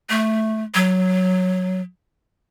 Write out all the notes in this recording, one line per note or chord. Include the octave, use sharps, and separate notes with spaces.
A3
F#3